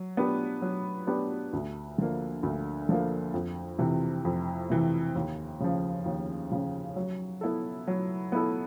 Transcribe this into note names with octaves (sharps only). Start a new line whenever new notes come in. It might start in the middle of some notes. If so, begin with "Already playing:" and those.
Already playing: F#3
B3 D4 G4 B4
F#3
B3 D4 G4 B4
D2
D3 F3 A#3
D2
D3 F3 A#3
F2
C3 E3
F2
C3 E3
D#2
C#3 F3
D#2
C#3 F3
F#3
B3 E4 A4
F#3
B3 E4 A4